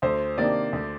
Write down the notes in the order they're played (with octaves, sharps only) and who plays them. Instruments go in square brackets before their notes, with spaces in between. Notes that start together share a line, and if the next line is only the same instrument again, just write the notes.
[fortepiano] D2 [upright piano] C5
[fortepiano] C3 D#3 A#3 D4 [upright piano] D5
[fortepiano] D2